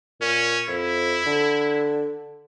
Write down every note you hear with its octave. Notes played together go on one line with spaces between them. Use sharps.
A#2 C#4
F2 E4
D3